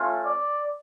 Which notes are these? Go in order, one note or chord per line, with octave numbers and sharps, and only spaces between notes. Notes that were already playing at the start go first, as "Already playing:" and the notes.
Already playing: A3 C#4 F4
D5